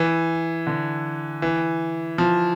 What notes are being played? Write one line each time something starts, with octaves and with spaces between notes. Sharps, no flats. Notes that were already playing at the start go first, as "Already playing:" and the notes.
Already playing: E3
D3
E3
F3